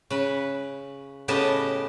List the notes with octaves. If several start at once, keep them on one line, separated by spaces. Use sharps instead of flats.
C#3 B4
A2 C#3 B3 G4 D#5 A5